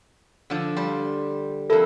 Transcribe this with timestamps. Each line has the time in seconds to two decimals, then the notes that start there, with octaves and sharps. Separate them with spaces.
0.50 D3 F3
0.76 G3 C5
1.70 F2 E4 A4 A#4